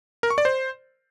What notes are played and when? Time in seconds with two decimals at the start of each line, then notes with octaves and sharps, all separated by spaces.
0.23 A#4
0.30 C#6
0.38 D5
0.45 C5